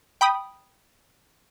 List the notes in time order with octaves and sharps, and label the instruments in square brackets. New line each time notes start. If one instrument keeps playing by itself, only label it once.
[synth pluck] G5 B5 D#6